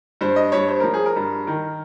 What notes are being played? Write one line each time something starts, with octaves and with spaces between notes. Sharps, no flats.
G2 C5
D#5
G2 C#5
C5
F3 A#4
G#4
A#4
G2
D#3 A#4